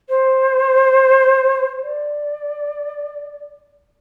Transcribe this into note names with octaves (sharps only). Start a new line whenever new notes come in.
C5
D5